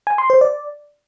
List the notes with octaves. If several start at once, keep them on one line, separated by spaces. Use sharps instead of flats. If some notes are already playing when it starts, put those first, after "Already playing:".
G#5
C6
C5
D5